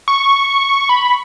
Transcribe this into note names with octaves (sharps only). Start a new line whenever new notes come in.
C#6
B5